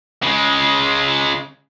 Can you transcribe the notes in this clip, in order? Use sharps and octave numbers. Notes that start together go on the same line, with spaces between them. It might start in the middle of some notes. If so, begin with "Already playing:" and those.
C#3 G#3